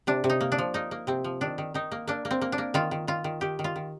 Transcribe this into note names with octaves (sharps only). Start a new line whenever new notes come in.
C3 D4
C3
D#4
A#3
D4
F3
A#3 D#4
A#3
C3 C4
F3
D#3 D4
D#3
D#3 D#4
A#3
A#3 D4
A#3
C4
A#3
D4
A#3
D#3 F4
D#3
D#3 F4
D#3
D#3 G4
D#3
F4
D#3